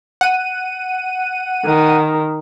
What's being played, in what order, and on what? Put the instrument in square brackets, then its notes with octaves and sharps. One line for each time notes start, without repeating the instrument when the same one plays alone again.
[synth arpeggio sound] F#5 D#7
[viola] D#3